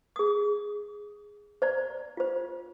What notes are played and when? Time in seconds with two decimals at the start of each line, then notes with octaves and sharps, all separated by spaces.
0.16 G#4 D#6
1.62 C5 D5 A#5
2.17 F4 C5